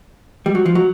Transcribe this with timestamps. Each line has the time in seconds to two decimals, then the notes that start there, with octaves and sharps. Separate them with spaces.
0.46 G3
0.55 F#3
0.66 F3
0.75 F#3